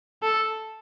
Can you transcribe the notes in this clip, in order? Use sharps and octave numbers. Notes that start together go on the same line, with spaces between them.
A4